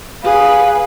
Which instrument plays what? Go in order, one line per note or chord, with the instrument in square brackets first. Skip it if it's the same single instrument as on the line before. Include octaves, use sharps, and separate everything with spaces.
[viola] G#4 B4 [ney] F5